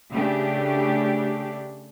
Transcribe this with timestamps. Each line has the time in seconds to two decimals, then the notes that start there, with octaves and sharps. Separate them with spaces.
0.11 C#3 A3 D4 G4